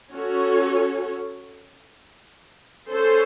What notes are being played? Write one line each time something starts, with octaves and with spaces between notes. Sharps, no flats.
C#4 F#4 A4 C#5
C#4 A4 C5